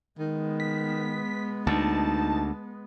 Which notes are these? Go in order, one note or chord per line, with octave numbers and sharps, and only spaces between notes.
D#3 G#3 B3
B6
D2 D#4 A5